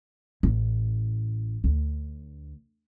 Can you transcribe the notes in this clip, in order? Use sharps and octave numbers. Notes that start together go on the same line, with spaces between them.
A1
D2